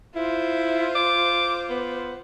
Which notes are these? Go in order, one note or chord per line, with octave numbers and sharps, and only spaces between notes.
E4 F4 C5
D6
B3